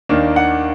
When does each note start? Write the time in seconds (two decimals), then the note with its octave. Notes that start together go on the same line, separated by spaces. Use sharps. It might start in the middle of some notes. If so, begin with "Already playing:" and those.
0.09 D#2 D#3 A#3 D4
0.36 F#5